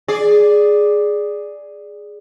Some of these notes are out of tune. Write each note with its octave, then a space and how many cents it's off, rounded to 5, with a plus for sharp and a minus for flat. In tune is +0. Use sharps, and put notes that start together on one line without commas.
G#4 +0 D5 +0